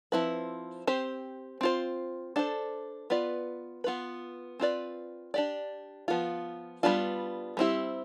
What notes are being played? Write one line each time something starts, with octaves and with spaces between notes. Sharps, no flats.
F3 C4 E4 B4
C4 G4 C5
C4 F4 C5
D4 A4 C5
B3 F4 B4 D5
B3 F4 B4
C4 F4 B4 D5
D4 G4 D5
F3 B3 F4
G3 B3 D4 F4
G3 C4 E4 G4